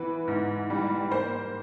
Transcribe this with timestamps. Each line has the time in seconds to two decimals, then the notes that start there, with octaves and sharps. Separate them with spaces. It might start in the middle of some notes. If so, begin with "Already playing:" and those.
Already playing: E3 B3 B4
0.28 G#2
0.70 G3
1.11 A#3 C5